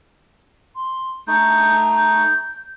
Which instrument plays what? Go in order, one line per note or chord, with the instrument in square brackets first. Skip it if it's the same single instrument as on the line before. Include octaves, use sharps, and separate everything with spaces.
[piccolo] C6
[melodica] A3 D#4 [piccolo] G6
[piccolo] G6